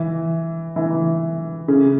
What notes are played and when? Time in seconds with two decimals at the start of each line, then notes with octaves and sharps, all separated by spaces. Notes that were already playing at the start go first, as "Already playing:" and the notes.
Already playing: E3
0.76 E3
1.68 C#3